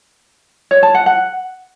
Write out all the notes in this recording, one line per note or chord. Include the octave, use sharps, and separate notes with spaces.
C#5
A5
F#5
F#5